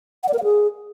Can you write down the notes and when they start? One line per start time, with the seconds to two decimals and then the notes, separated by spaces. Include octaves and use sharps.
0.23 F#5
0.29 D5
0.34 A#4
0.39 F5
0.44 G#4